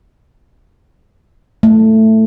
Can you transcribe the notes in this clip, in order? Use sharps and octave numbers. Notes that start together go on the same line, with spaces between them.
A3